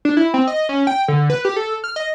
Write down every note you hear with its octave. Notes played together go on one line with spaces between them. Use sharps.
D4
E4
C4
D#5
C#4
G5
D3
B4
G4
A4
F6
D#5